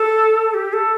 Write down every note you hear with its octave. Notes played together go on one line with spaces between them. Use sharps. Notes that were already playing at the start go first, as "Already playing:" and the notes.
Already playing: A4
G4
A4